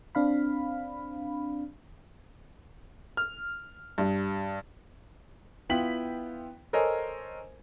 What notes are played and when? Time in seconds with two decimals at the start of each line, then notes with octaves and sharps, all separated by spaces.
0.15 C4 D4 F5 B5
3.17 F6
3.98 G2
5.70 B3 E4 F4 G5 B6 F#7
6.73 A4 A#4 C5 C#5 D#5 G#5